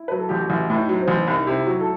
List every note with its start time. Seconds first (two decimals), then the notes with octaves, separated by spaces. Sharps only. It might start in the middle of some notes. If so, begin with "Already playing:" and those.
Already playing: E4
0.08 F#3 B4
0.18 A4
0.29 A1 G4
0.39 F#4
0.50 A1 E4
0.70 A2
0.76 D#4
0.89 F#3
1.01 C4
1.08 A1
1.27 C2 D#4
1.47 C3 E4
1.61 E4
1.66 F#3 F#4
1.80 A4